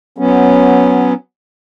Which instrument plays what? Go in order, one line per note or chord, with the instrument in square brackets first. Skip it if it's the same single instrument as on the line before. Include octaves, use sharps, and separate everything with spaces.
[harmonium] F#3 B3 C#4